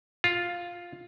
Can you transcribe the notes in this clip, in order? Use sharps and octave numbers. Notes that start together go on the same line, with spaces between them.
F4